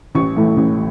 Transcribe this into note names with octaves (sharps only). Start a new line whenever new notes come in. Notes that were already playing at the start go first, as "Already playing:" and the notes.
A1 C#6
A2 E3 A3
A1